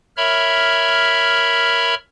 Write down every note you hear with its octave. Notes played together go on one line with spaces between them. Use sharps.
A#4 C#5 E5 B5 F6